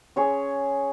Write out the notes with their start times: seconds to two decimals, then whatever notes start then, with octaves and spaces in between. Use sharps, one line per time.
0.16 C#4 G#4 C#5